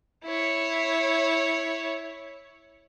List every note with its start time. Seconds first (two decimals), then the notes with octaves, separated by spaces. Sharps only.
0.25 E4 C#5